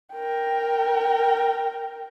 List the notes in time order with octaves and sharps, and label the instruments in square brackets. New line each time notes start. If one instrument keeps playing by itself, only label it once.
[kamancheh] A#4 G5